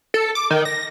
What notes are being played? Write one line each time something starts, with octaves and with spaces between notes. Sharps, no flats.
A4
D6
D#3
A#6